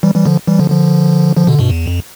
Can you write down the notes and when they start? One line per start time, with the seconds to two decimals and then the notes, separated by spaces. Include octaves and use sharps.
0.03 E3 G3
0.14 E3 G3
0.26 D3 F3
0.48 E3 G3
0.59 D3 F3
0.70 D3 F3
1.36 D3 F3
1.47 B2 D3
1.59 G2 B2
1.70 E2
1.86 F2